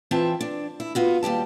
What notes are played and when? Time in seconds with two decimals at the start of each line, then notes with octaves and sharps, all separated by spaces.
0.11 E3 C4 F4 E5 G5 A5
0.41 D4
0.80 E4
0.95 B3 F4 F#4
1.23 D#2 G3 G4 A5